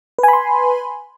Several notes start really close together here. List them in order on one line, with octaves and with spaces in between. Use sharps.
B4 G#5 B5 C6